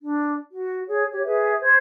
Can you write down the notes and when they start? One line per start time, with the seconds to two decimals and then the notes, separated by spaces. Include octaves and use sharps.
0.02 D4
0.50 F#4
0.88 G#4 C#5
1.11 G4 C#5
1.24 G#4 B4 E5
1.61 C5 G#6